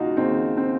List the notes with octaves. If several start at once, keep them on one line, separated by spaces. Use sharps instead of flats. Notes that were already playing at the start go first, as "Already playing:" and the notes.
Already playing: D#2 C#3 D#4 F4 F#4
D#2 C#3 C4 D#4
C4